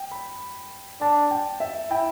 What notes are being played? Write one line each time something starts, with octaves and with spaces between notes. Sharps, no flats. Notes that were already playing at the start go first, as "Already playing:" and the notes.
Already playing: G5
B5
D4 A5
G5
E5
E4 G5